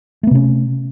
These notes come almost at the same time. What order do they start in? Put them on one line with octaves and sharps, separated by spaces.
A3 B3 C3 C#4